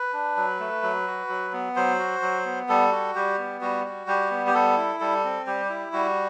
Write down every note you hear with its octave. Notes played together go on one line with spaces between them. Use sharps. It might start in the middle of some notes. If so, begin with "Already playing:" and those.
Already playing: B4
D4
F#3
A3
F#3
F#4
F#3
B3
F#3 C5
F#4
F#3
B3
G3 A4
F#4
G3 G4
B3
G3 F#4
F#4
G3 G4
B3
G4
G3 A4
E4
G3 A4
C4
G3 G4
E4
G3 F#4